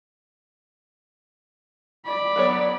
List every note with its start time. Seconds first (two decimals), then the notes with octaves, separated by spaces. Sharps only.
2.05 D5 B5
2.36 F#3 B3 C#5